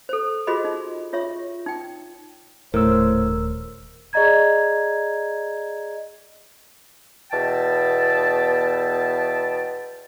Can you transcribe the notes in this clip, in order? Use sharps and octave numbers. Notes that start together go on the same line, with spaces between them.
A4 C5
F4 F#4 G#4 C5 D#5 B5
D#4
F4 C#5 E5 C#6
D#4 G5
D#1 A2 A3 A#4 C5 E6
G#4 D5 D#5 A#5 G#6
E2 B2 E5 G5 A5